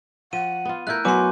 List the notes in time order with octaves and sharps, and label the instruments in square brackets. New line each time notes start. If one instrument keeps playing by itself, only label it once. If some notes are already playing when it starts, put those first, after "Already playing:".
[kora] F3 [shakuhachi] F#5 [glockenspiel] D#7
[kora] B3 F4
[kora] A3 E4 A#4 [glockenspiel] F#6 G6
[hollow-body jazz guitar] F#3 B3 F#4 [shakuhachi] G#5 [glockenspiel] C6 D6